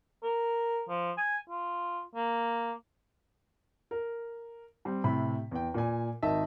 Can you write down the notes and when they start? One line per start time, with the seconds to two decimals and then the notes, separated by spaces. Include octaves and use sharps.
0.23 A#4
0.89 F3
1.18 G#5
1.49 F4
2.15 A#3
3.91 A#4
4.85 G3 C4
5.04 A2 C3 B5
5.51 E2 G5
5.74 A#2 D5 G#5
6.22 G#1 D#3 D#5 E5 A5